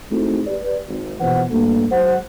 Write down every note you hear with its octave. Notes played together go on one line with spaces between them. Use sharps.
G#3 A3 C4 D#4 E4 F#4
G4 B4 D5
G#1
A#1 B2 E3 B4 C5 F#5
D2 G2 A3 A#3
F#3 G#3 C5 F#5